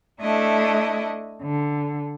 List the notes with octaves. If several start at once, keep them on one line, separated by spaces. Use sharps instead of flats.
A3 D4 E4 D#5
D3